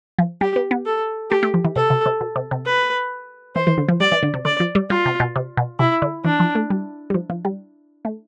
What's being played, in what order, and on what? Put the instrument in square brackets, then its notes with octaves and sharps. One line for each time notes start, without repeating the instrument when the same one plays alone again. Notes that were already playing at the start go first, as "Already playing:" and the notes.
[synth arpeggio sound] F3
[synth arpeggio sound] G3 [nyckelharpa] G4
[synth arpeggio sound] B3
B3
[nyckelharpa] A4
[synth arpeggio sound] A3 [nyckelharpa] G4
[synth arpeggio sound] A3
F3
E3
[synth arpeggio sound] C3 [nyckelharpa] A4
[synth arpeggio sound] C3
C3
B2
C3
C3
[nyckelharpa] B4
[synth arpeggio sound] E3 [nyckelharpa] C5
[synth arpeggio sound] E3
D3
F3
[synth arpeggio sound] G3 [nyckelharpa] D5
[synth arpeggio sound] E3
D3
C3
[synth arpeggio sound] D3 [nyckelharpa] D5
[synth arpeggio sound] F3
G3
[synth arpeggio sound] G3 [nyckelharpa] F4
[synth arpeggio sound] C3
B2
C3
B2
[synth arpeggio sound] C3 [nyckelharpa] E4
[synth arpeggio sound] D3
[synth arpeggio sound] E3 [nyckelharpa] D4
[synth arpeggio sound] F3
A3
G3
G3
F3
F3
G3
A3